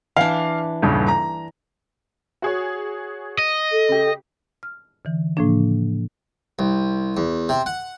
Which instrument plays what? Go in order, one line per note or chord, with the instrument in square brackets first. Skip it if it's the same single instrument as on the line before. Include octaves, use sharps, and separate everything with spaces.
[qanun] E3 D4 [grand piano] F5
[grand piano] D#1 G2 C#3
A#5
[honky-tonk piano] F#4 G#4 C#5
[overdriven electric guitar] D#5
[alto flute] A4
[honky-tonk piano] C#3 G4
[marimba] F6
D3 E3
A2 C#3 F3 A#3 D4
[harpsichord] C2
E2
C3
F#5